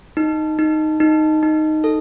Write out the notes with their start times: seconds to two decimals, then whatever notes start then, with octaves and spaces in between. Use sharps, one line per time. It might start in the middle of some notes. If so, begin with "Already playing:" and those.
0.17 D#4
0.59 D#4
1.00 D#4
1.43 D#4
1.84 A4